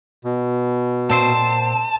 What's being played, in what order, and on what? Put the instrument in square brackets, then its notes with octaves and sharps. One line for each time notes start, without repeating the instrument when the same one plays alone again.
[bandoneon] B2
[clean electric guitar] A#2 C4 C5 [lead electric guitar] A5